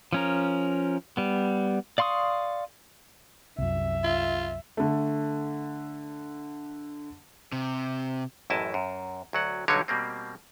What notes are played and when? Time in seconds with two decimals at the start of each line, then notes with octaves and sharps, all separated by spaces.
0.13 F3 C#4 A#4
1.17 G3 B3
1.98 D5 F5 C6 C#6 D#6
3.58 C2 F#2 E5
4.04 F4
4.77 D3 A3
7.52 C3
8.50 A1 F#2 A2 E4 D#5 A5
8.74 F#2
9.33 D2 F#3 F#5
9.68 B1 D3 F#3 G3 D#4 C#5
9.88 B2 G3 A#3 C4